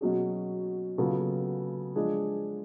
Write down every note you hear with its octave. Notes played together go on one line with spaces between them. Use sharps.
B2 F#3 C#4 G#4
C#3 F#3 B3 F4 A4
F3 G#3 D4 G#4